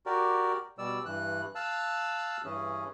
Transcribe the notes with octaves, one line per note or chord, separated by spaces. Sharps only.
F#4 G4 A#4 D5
B2 G3 D5 E6
G2 E3 F#6
F5 A5 E6 F#6
G2 E3 C#4 G#4